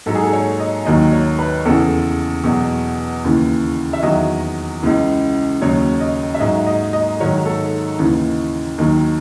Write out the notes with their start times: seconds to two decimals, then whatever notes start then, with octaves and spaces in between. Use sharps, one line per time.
0.06 G#2 F#3 A4
0.15 G#4
0.23 A4
0.33 C#5
0.60 D#5
0.85 D#2 D#3 F#3 D#5
1.12 C#5
1.39 B4
1.65 E2 C#3 E3 A4
2.44 E2 B2 F#3
3.24 D#2 C#3 E3
3.93 E5
4.02 E2 D#3 F#3 D#5
4.83 C#2 C#3 E3
5.61 D#2 C#3 F#3 C#5
6.00 D#5
6.35 E5
6.40 G#2 F#3 D#5
6.67 D#5
6.93 D#5
7.20 G#2 D#3 F#3 C#5
7.46 A4
7.99 D#2 C#3 E3
8.78 D#2 D#3 F#3